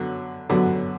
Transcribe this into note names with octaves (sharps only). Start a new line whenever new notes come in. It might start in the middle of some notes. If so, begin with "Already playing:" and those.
Already playing: F#2 D3 F#3 B3
F#2 D3 F#3 B3